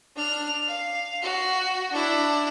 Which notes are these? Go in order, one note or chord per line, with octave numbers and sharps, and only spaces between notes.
D4 F6
F5
F#4
D4 E4